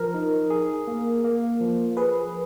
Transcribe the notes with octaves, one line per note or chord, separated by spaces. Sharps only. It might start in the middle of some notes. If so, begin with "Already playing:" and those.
Already playing: F3 A#4
D#4
G#4
A#3
A#3
F3
G#4 B4